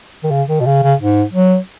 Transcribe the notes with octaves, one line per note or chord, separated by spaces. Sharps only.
D#3
C#3
D#3
B2
C#3
C#3
G#2
F#3